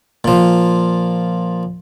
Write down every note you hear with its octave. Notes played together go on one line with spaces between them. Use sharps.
A#2 F3